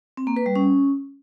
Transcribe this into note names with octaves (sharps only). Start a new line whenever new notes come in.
C4
A#3
B4
G3
C#4